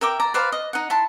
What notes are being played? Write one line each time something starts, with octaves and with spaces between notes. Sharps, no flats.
A#4 E5 G5 D6
D5 A#5
B4 C5 D5 F5
D#5
D#4 F#5
E4 A5 C6